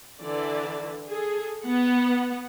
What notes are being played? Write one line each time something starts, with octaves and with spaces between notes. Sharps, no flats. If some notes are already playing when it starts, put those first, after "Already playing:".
D3 E3 D5
G#4 A4
B3 F#5